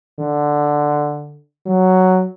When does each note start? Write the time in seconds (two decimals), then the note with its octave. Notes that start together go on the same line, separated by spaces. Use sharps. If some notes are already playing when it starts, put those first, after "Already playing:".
0.19 D3
1.67 F#3